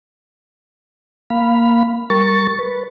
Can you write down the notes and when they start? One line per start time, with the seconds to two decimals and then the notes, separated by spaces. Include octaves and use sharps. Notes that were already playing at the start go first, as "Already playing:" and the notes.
1.30 A#3 F5 B5
2.10 G3 A#4 C#6 A6
2.59 B4